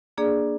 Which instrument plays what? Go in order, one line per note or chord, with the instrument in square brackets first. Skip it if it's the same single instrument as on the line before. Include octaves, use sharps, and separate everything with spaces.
[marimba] A#3 D4 G#4 D5